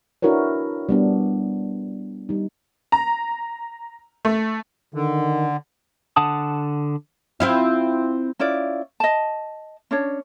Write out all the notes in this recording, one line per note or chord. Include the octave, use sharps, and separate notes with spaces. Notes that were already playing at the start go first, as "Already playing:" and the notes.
D4 E4 F#4 A#4 B4 C#5
G3 B3 D4
G3 D#4
A#5
A3
D3 D#3
D3 F#5 A5 D#6
C4 E4 F4
C#4 E4 F4 D5
D#5 A5
C#4 D4 C#5